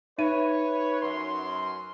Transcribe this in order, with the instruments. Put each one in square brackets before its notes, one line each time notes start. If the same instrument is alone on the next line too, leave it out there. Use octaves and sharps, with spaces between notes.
[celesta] D#4 E5 D#7 [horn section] B4 C#5
[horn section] F#2 C6